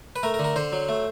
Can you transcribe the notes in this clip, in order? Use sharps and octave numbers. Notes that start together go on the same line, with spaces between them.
B4
A3 A#4
A#4
D3
A#4
D3 C5
F#3
A3